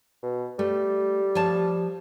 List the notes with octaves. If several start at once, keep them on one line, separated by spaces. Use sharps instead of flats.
B2
G3 A3
F3 C#5 A5